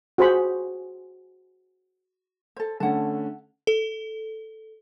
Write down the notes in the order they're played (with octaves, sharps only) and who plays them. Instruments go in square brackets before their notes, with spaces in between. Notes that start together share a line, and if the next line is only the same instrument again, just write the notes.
[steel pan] F#4 G#4 C5 F#5 B5 C#6
[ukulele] A4 C5
[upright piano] D3 A3 C#4 [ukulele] F#5 A5
[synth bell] A4